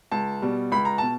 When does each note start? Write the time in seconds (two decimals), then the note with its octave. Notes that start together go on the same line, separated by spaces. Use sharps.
0.11 C#2 A5
0.42 B2 G3
0.72 C#2 B5
0.85 A#5
0.98 B2 A5